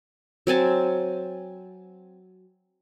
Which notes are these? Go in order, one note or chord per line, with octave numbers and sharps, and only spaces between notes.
F#3 C4 G#5 A5